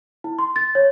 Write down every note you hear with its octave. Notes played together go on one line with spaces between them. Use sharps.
E4
C6
A6
C#5